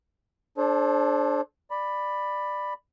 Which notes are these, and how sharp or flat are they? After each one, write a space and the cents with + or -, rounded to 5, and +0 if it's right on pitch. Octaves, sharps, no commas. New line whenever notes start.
D4 +0 A4 -30 C5 +30
D5 +15 B5 +0